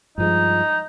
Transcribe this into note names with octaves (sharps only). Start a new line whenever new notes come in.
G2 F3 G#3 D#4